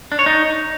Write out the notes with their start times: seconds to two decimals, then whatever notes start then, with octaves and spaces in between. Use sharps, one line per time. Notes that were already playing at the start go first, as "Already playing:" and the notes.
0.12 D4
0.19 C#5
0.26 D#4